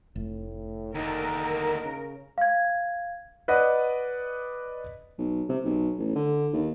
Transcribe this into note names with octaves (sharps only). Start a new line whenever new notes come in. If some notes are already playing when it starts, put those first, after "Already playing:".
F1 A2
D#2 D3 D#4 A#4
C#3
F5 G#6
B4 D5 D#5 F#5
B1
C3
B1
A1
D3
D#2